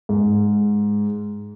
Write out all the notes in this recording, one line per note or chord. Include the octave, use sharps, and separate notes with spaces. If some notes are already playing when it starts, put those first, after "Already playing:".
G#2